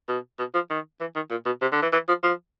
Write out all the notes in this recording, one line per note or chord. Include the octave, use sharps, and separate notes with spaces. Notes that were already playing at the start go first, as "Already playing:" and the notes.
B2
B2
F3
D#3
E3
D#3
A#2
B2
C3
D3
E3
E3
F3
F3